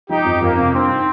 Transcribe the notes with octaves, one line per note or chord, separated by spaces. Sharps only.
F3 D#4 G4
F2
F2 A#3
C3
G2 C4
D#4